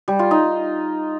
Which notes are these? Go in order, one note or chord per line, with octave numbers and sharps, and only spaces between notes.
G3
F4
D#4